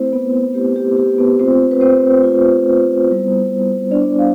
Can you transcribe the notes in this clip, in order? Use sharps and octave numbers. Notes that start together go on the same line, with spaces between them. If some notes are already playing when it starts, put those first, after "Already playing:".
Already playing: A3 C4 E4 C5
B3 B4
A3 E4 G4
G4
G4
B3 B4
A3 C4 F4 C5
B4
C4 C5
A3 C4 F4
G3 B3 E4
G3 B3 D4 E4 D5
F5